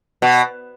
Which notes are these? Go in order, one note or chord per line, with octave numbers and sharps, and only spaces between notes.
B2